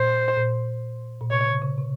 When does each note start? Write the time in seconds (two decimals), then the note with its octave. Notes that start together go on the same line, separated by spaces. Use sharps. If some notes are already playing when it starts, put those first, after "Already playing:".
Already playing: A#2 C5
0.37 A#2
1.21 A#2
1.31 C3 C#5
1.46 C#3
1.62 C#3
1.77 C3